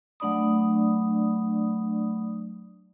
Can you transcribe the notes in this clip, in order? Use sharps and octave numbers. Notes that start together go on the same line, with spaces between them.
F#3 A3 D4 D5 B5 D#6